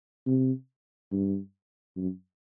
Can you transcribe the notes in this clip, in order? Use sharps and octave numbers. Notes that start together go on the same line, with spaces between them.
C3
G2
F#2